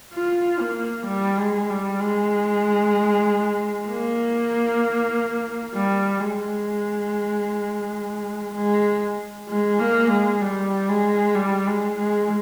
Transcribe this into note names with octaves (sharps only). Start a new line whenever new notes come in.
F4
A#3
G3
G#3
G3
G#3
A#3
G3
G#3
G#3
G#3
A#3
G#3
G3
G#3
G3
G#3
G#3